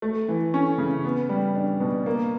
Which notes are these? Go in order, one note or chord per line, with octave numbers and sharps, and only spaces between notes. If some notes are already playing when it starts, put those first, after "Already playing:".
A3
E3
C#4
C#3
B3
G3
D4
B2
A#3